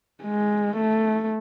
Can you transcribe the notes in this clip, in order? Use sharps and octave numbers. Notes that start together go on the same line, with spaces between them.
G#3
A3